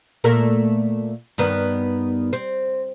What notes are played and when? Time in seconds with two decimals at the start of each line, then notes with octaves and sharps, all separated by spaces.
0.24 A#2 A3 A#4
1.38 G2 D#3 B3
2.33 C4